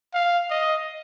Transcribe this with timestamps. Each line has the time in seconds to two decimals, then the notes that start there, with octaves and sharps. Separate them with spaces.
0.14 F5
0.50 D#5